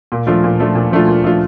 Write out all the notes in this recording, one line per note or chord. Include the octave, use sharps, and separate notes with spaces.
A#2
F3 A3 D4 F4
A#2
F3 A3 D4 F4
A#2
F3 A3 D4 F4
A#2
F3 A3 D4 F4